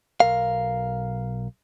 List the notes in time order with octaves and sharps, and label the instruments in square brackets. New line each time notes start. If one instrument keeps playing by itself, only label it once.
[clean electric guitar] B1 A#4 F5